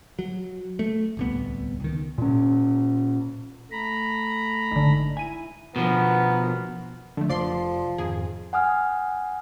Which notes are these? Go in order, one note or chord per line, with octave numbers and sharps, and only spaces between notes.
F#3
A3
D1 C2 B3
C#2 D#3
A#2 C#4
A3 A#5 B5
G#1 D3
E4 G#5 D#7
B2 F3 B3 A#4
D3 F3 A3
F1 F3 D5 C6
F2 G#2 D#3 G#4
F#5 G#5 D#6 F6